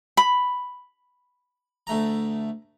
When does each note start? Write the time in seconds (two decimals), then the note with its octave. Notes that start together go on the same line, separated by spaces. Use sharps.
0.17 B5
1.87 D2 A3 A#5